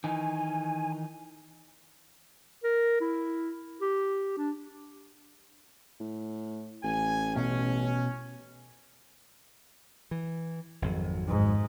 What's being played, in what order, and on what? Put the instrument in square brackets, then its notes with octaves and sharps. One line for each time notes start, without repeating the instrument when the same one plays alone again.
[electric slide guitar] D#3 E3 D#4 [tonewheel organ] G#5
[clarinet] A#4
E4
G4
D4
[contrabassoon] A2
[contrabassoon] A1 [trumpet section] G#5
[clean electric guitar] B2 [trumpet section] C#4
[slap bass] E3
G#1 F2 F#3
[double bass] G#2